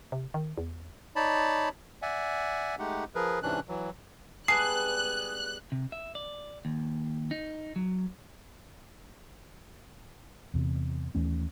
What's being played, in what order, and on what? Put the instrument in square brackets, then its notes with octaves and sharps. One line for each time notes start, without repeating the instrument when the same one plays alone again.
[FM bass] C3
D#3
E2
[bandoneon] D#4 C#5 D5 A5 B5
D5 E5 F#5 G#5
G#3 A3 D#4 G4 F#5
F3 G#4 A#4 B4
G#2 C3 E3 C#4 D4 F#6
E3 F#3
[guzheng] G3 G#3 B3 [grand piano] G#5 A5 D#6 [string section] F#6 [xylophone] C7
[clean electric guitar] C3
E5
D5
D#2
D#4
F#3
[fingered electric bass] E2 C3
D#2 E3 A3 C#4